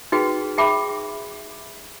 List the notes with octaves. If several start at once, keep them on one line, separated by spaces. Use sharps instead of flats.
D#4 F#4 G#4 B4 G5
G#4 E5 G5 A5 B5 D6